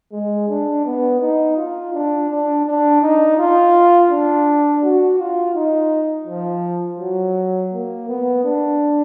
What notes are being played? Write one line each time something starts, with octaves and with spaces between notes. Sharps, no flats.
G#3
D4
B3
D#4
F4
D4
D4
D4
D#4
F4
D4
F#4
F4
D#4
F3
F#3
A#3
B3
D4